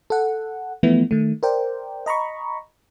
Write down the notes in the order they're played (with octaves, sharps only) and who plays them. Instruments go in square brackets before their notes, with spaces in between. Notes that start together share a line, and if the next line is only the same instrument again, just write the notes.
[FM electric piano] A4 F#5
E3 F3 A3 B3 E4
D#3 A3
A#4 C5 D5 G5
D#5 A#5 B5 C#6